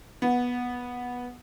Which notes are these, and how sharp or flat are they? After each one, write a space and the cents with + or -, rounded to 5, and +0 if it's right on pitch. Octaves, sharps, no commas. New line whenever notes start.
B3 -10